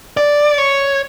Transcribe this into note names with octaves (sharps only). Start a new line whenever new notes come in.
D5
C#5